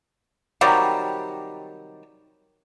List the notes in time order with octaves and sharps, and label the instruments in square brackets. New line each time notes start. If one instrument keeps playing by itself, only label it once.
[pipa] C3 D#3 F#3 G3